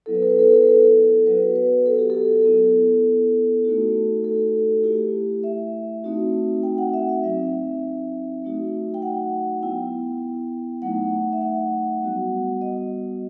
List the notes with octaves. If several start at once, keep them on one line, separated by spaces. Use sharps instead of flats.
F#3 B3 E4 A4
B4
A4
B4
A4
B4
A4
B4
A4
F#3 B3 F#4 B4
B4
A4
G4
A4
B3 E4
A3 D#4 F#4
A4
A3 E4 G4
E5
A3 C4 D#4 F#4
G5
F#5
E5
E5
F#3 C4 D#4 E5
F#3 A3 D#4 F#4
G5
F#5
B3 E4 G5
F#3 A3 D#4 F#5
E5
F#5
G3 B3 F#4
D#5